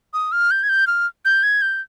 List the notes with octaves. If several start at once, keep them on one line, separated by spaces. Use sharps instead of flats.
D#6
F6
G6
G#6
G6
F6
G6
G#6
G6